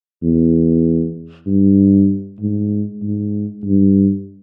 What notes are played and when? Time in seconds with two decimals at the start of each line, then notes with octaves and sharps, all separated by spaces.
0.23 E2
1.46 G2
2.40 G#2
3.03 G#2
3.65 G2